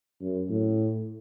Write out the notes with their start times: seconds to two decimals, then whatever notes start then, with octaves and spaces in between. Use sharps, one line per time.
0.21 F#2
0.49 A2